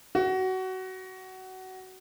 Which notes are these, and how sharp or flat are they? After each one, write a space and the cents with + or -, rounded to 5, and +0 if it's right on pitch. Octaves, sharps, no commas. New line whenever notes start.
F#4 +20